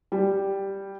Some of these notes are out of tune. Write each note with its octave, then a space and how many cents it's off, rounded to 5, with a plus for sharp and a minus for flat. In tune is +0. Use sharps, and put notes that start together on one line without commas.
G3 -5